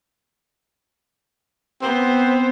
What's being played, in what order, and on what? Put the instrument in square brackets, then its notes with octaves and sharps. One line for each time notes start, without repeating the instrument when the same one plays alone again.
[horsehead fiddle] B3 C5 [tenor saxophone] C4